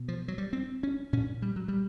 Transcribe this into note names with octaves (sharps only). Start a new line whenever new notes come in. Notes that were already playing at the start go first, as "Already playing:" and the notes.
Already playing: B2
F3
F#3
G3
C4
C#4
A#2 C#4
G3
F#3
G3